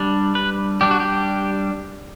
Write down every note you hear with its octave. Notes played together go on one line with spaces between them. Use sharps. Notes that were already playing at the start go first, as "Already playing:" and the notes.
Already playing: G3 D4
B4
G3 D4 G4
F#4
G4